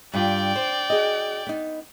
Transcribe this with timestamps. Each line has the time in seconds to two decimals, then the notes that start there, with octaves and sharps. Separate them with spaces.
0.13 G2 G3 F4 D5 G5
0.55 C5
0.90 F#4 G#4 D#5
1.47 B3 D#4